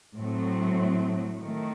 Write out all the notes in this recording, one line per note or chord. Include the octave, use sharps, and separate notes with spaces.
A2 F#3 A3 C4
D#3 A3